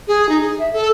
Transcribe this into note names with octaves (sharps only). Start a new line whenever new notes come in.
G#4
D#4
G#4
E5
A4